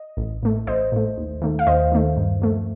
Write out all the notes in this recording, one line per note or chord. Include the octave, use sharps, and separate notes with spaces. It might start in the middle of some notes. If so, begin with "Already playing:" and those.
Already playing: D#5
A1
A2 A3
A1 C5 D#5
A2 A3
D#2
D#3 A3
F5
D#2 C5 D#5
D#3 A3
G2
F3 A3